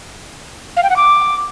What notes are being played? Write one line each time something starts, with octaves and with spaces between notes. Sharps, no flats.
F5
G5
F#5
D6